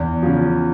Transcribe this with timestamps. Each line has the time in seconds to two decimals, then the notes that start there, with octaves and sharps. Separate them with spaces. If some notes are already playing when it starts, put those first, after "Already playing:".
Already playing: E2
0.23 C#3 F3